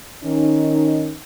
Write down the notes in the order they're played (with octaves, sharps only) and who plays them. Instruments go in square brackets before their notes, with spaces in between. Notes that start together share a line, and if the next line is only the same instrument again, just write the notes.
[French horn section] D#3 C#4 D#4